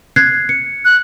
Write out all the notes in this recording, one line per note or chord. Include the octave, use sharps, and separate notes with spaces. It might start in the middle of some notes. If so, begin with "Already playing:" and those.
F#6 G#6 C7
C#7
F#6